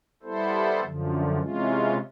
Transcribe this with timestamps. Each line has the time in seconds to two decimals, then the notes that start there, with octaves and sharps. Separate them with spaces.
0.23 G3 B3 E4 A4 C5
0.80 F#2 D3 F3
1.37 C3 E3 G#3 C#4 F4